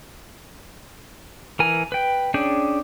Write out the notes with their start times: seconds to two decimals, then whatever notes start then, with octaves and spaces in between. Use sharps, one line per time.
1.59 E3 A#4 G#5
1.92 B4 G5
2.34 C#4 D4 G#4 G5